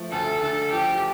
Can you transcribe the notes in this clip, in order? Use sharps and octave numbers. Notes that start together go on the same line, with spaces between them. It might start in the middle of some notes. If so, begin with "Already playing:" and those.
Already playing: F3 A3
D2 A4
D3 A4
F3 G4